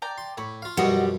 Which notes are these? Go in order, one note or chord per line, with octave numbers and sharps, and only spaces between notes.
D5 G5 A#5
C6
A2 B5 C#6
F4 F5
F#2 B2 F3 G3 F#4 D#5